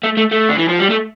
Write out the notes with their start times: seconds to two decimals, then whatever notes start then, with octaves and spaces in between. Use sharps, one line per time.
0.03 A3
0.17 A3
0.32 A3
0.50 D3
0.59 E3
0.69 F3
0.79 G3
0.90 A3